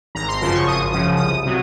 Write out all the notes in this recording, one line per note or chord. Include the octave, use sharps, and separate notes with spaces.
G#1 A#5
C6
F#2 C#3 F3 C6
C#6
G#1 D#6
F#2 C#3 F3 D#6
C2 D#6
C3 F#3